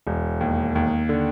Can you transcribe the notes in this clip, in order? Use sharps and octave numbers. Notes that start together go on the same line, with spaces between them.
E1
D#2
D#2
D3